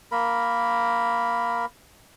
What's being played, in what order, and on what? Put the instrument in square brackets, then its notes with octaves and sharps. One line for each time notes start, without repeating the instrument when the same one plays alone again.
[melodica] A#3 A#4 B5